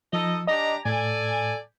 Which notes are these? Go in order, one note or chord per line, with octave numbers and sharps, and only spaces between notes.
F3 D#4 A4 D#5
D4 G4 D#5 A#5
A2 A4 D5 G#5